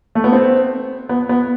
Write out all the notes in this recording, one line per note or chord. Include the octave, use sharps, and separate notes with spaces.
A3
B3
C4
B3
B3